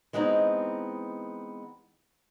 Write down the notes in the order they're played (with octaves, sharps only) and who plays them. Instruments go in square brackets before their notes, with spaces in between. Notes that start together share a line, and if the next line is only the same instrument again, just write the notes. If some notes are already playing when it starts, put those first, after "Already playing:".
[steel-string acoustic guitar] E3 G#3 B3 C4 D4 D#4